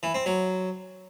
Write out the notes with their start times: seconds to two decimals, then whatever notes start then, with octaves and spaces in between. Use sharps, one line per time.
0.03 E3
0.14 C4
0.26 F#3